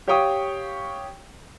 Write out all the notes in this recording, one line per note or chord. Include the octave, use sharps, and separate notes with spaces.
G4 C#5 F5 G5 C#6 D#6